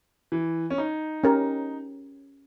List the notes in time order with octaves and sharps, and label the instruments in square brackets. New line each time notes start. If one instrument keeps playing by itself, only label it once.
[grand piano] E3
C#4
D#4
[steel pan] C#4 G4 A#4